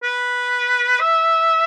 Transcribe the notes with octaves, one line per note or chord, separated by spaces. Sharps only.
B4
E5